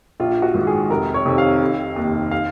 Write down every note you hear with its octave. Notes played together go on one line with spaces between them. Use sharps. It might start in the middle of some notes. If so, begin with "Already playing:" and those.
A#1 F4
F#4
G#2 D#3
G#4
F1 A#4
C#5
F2 C3 D#3
F5
F1
D#2 D#3
F5